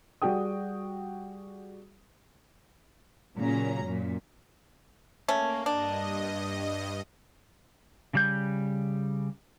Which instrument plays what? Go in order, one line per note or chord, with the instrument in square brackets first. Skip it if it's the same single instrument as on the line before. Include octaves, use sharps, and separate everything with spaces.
[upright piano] G3 F#4 G#4 G5 D#6
[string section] A#2 C#3 F#3 C#4 A#5
F#2 A#2
[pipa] A3 C#4 [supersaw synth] A#3
[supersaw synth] G2 D#5 [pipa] D4
[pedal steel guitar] C#3 G3 G6